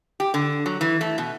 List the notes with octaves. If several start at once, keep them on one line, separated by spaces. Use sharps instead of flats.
G4
D3
F#3
E3
A3
B2